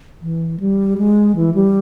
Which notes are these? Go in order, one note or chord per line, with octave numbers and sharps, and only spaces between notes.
E3
G3
G#3
E3
G3